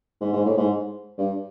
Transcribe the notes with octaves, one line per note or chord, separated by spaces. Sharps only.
G#2
G#2
A2
G#2
G2